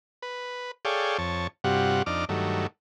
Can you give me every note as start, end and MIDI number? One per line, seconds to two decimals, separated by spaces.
0.22 0.71 71
0.85 1.18 68
0.85 1.18 69
0.85 1.18 73
0.85 1.18 74
0.85 1.18 77
0.85 1.18 79
1.18 1.47 41
1.18 1.47 73
1.18 1.47 81
1.64 2.02 43
1.64 2.02 48
1.64 2.02 55
1.64 2.02 65
1.64 2.02 66
1.64 2.02 78
2.06 2.25 41
2.06 2.25 62
2.06 2.25 63
2.06 2.25 86
2.06 2.25 89
2.29 2.67 43
2.29 2.67 51
2.29 2.67 54
2.29 2.67 57